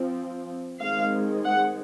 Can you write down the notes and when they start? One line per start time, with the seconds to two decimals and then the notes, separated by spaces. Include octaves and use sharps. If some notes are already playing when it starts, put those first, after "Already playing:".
Already playing: F3 C4
0.80 D#3 G#3 C4 F5
1.46 F#5